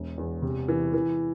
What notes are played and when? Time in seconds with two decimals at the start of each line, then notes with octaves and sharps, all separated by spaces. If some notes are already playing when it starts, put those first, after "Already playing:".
Already playing: E1
0.18 E2
0.42 C3
0.68 E3
0.94 E3